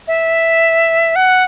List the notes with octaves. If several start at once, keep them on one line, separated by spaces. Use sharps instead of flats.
E5
F#5